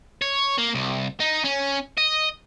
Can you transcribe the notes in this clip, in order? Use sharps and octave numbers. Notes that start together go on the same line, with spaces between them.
C#5
A#3
C2
D#4
C#4
D#5